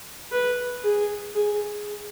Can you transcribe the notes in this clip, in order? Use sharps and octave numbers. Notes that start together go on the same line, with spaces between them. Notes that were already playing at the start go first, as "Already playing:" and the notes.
B4
G#4
G#4